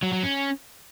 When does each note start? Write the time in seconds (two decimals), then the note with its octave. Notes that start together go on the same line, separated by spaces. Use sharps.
0.03 F#3
0.13 F#3
0.23 C#4